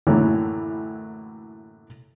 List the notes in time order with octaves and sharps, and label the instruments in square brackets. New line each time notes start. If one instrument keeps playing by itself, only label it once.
[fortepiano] F#2 A2 D3 E3 F#3 A#3